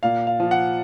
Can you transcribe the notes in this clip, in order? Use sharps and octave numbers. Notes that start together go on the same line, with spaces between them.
A#2 F5
F5
F3
F#5